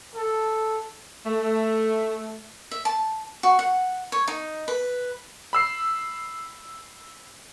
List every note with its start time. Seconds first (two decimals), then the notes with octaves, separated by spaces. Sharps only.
0.15 A4
1.25 A3
2.72 E5
2.85 A5
3.43 F#4
3.59 F#5
4.12 C#5
4.28 D#4
4.68 B4
5.53 B5 E6 C7